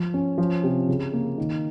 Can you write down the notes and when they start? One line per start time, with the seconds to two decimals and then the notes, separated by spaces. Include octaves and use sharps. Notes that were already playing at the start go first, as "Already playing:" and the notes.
Already playing: F3
0.14 C#4
0.38 F3
0.63 C3
0.89 C#3
1.13 A#3
1.38 D#3